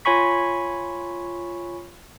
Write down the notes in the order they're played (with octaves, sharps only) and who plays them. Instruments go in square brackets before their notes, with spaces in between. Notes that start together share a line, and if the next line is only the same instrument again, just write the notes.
[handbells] F4 C#5 G#5 B5 C#6 B6